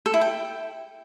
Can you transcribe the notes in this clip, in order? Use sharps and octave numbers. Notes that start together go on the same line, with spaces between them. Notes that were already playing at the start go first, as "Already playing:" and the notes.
A4
E4
G5